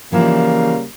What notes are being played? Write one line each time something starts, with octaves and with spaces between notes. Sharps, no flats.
C#3 E3 F3 G3 A#3 E4